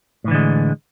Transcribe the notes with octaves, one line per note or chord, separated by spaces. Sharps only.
A2 D3 E3 G#3